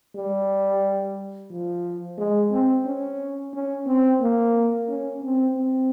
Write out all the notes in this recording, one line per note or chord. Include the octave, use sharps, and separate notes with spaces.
G3
F3
G#3
C4
C#4
C#4
C4
A#3
C#4
C4
C4